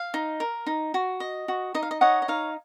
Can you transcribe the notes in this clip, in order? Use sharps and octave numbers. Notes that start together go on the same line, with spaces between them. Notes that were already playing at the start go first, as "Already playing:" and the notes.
Already playing: F5
D#4
A#4
D#4
F#4
D#5
F#4
D#4 D#5
F5
D#5
C#5 D#5 F#5
D#5
D#4 F5